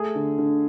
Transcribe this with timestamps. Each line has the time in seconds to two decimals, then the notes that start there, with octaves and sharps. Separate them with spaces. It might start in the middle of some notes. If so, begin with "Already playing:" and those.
Already playing: A3 G#4
0.15 D3
0.38 D3